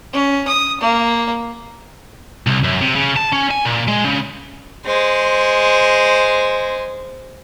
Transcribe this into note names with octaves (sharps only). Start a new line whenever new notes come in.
C#4
D#6
A#3
C2
F#2
C3
C#3
A5
C#4
G#5
A#2
G#3
C#3
G#3 C5